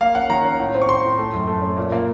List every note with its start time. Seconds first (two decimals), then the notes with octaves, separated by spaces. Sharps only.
0.01 A#3 F5
0.15 C#4 F#5
0.29 D#3 A#5
0.45 C#4
0.59 A2
0.75 C4
0.82 C#6
0.89 C4 C6
1.04 A2
1.18 A3
1.33 F#2
1.47 A3
1.62 C#4
1.77 A#2
1.92 A#3